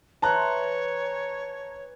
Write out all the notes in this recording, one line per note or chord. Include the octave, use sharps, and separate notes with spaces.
E3 C#5 A5 A#5 C6 F#6